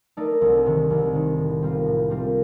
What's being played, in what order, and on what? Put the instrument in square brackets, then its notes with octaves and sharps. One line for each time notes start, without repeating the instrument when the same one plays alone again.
[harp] A3 D#4 A#4 D5
C2
C3 D#3
C2
C3 D#3
A2
G3 C4 F4 A#4
A2
G3 C4 F4 A#4